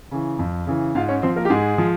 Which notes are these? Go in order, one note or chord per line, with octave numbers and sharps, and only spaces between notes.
C#3 E3
F2
C#3 E3
G#2 F4 F5
C#4 C#5
F3 C4 C5
A#3 A#4
G4
G#2 G#3 G#4
F3